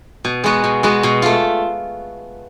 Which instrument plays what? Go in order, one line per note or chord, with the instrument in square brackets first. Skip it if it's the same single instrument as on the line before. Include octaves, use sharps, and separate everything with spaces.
[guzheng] B2
G#3 B3 F#4
B2
G#3 B3 F#4
B2
A3 F4